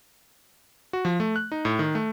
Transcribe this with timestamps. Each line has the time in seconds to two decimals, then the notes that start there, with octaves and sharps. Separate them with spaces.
0.93 F#4
1.05 F3
1.20 A3
1.36 F#6
1.52 D#4
1.65 A2
1.79 D#3
1.95 A3